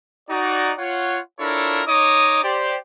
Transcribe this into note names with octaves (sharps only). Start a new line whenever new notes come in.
D#4 F#4 D5
F4 C#5 F#5
D4 E4 F4 A4 A#4 C#5
D#4 C#5 D#5 D6 D#6
G4 C5 D5